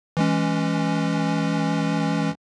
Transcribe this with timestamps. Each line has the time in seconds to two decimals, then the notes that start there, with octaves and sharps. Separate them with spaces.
0.17 E3 G#3 C#4